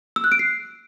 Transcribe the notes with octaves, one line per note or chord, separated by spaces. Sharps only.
E6
F#6
D7
C7